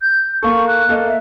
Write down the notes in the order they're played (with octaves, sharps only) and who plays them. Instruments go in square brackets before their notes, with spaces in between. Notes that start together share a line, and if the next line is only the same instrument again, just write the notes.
[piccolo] G6
[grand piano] A#3 A4 [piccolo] C#6
[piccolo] F#6
[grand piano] A#3 A4 D#5
[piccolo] E5